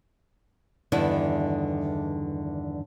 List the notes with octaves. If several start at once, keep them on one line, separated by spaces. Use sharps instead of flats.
E2 G2 D3 D#3 E4